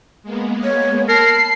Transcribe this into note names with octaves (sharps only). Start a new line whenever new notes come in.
G#3 A#3 B3
C#5
A#4 A5 B5 C7